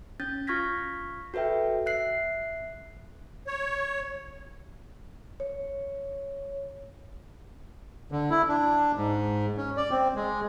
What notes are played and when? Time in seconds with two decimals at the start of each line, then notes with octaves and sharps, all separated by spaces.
0.20 C#4 G6 A6
0.47 F4 C#6 F6 G#6 A#6 B6
1.34 F#4 A4 B4 E5 G5
1.86 E5 F#6 C7
3.47 C#5
5.40 C#5
8.12 D3
8.30 E4
8.48 D4
8.96 G#2
9.57 C#4
9.77 D5
9.91 C4
10.16 G#3